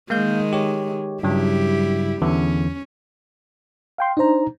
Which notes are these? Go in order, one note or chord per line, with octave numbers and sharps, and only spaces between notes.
D#3 G#3 A#3 F5 G6
G4 C#5
G2 C#3 F#3 G3 E4 G4
E2 D3 E3 C#4
F5 G5 C6
D4 D#4 C5 A#5